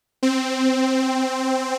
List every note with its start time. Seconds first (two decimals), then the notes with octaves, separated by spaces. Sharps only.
0.23 C4